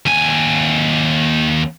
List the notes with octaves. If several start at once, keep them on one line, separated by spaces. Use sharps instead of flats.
D#2 G#5